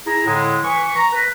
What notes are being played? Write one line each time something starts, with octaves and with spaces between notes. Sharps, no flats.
E4 G#4 A#5
A2 D3 G#3
E3 C#6
A#5
B4